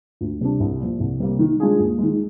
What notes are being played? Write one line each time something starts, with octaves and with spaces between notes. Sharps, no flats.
D2
C3 G3 D4
C2
A#2 F3
C2
C3 G3 A#3
D#3
G#3 D4 F4 G#4
D#2
D#3 G#3